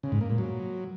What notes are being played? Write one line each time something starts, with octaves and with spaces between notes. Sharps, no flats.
C#3
G#2
A#3
A#2
F#3